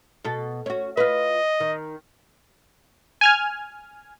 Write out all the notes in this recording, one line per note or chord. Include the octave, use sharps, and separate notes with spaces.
B2 A4
C#4 F#4
F4 B4 D#5
D#3
G#5 F6 G#6